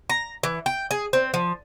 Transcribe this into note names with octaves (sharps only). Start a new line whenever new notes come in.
A#5
E3
G5
G#4
C4
F3